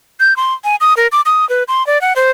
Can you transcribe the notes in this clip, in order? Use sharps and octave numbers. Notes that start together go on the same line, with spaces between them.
G6
C6
G#5
D#6
A#4
D6
D#6
B4
C6
D5
F#5
C5